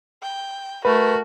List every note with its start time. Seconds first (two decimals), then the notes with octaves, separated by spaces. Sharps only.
0.22 G5
0.85 A3 F#4 A#4 B4